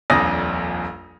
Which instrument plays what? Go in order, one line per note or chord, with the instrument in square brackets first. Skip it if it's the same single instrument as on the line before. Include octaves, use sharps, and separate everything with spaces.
[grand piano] D#1 A#1 F2 D5 D#6 A#6